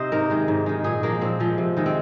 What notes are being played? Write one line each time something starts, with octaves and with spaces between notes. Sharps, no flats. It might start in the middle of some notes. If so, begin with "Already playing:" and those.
Already playing: C3 C4 D#4 C5 D#5
G#2 A#4
D#3 G#3
G#2
D#3 G#3
A#2 G#4
F3 G#3 A#3
A#2 C4
F3 G#3
C3
D#3 G#3
C4